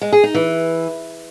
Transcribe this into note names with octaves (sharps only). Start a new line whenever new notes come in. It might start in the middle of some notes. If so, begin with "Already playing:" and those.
G#3
G#4
D#4
E3